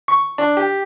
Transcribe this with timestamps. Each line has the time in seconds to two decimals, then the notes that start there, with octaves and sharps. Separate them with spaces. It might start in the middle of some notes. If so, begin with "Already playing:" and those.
0.08 C#6
0.38 D4
0.57 G4